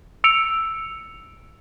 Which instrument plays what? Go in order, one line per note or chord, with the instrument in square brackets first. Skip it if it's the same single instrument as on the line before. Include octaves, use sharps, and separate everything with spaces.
[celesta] E6 C#7 D7 F7